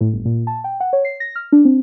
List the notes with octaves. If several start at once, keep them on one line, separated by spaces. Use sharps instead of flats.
A2
G1
A#2
A5
G5
F#5
C#5
C7
A#6
F6
D4
C4